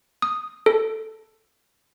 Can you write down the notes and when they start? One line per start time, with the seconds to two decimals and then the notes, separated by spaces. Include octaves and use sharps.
0.22 D#6
0.66 A4